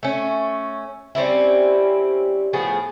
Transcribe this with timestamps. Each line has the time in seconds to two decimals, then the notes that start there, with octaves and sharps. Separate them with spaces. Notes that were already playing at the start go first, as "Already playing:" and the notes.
0.03 A3 C#4
1.15 G3 C4 C#4 E4
2.53 A2 F3 B3 G#4